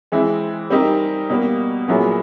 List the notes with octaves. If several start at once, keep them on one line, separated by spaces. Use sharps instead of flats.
E3 G#3 C4 E4
G3 C4 D#4 G4 A#4
B2 G3 A#3
A#2 F#3 B3 E4 G#4